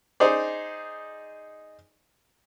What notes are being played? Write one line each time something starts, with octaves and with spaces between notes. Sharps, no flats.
D#4 G#4 C5 D5